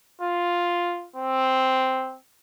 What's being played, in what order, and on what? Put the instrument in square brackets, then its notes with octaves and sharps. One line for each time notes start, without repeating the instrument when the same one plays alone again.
[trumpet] F4
C4